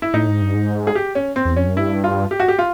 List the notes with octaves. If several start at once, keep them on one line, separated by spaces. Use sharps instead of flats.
E4
A2 D#4
G#2
G2
G#2
G#4
G4
C#4
C4
E2
F2 C#4
F#2
G2 E4
F4
G4
F#4
G4
F4